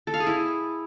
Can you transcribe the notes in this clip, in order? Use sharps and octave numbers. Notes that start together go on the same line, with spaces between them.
A4
F5
G#4
E4